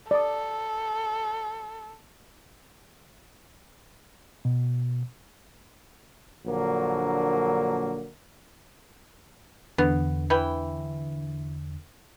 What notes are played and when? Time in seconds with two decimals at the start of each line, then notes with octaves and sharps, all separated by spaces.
0.11 A4 D5 D#6
4.45 B2
6.46 A#1 D3 F#3 A#3
9.78 E2 D3 B3
10.30 E3 B4 G5